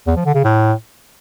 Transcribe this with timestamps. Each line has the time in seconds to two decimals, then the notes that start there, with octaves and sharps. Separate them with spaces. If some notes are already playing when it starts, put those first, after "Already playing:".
0.07 E2
0.16 F3
0.26 D3
0.35 C#3
0.44 A2